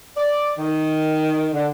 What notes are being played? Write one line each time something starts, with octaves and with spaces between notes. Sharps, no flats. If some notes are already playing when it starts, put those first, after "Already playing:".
D5
D#3
D3